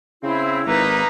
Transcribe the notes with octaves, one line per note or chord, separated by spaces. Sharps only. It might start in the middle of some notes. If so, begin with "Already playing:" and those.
C#3 C4 E4
G#1 A#3 D#4 B4 A#5